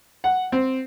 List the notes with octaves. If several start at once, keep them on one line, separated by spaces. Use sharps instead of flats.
F#5
C4